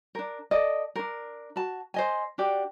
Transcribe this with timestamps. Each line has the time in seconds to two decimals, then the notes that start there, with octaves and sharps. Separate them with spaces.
0.15 D4 A#4
0.51 A4 D5 D#5
0.96 D4 A#4
1.56 F#4 A5
1.94 C5 D#5 G#5
2.38 D4 F#4 G4 D5